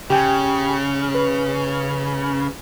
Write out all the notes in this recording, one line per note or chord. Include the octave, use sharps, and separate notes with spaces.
C#3 G4 G5 G#5
B4